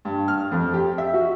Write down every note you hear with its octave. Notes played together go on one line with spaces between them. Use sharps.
G2
F6
F2
G4
E5
F#4